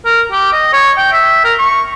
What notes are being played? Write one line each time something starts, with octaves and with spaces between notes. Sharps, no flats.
A#4
G4
D#5
C#5
G5
E5
A#4
C#6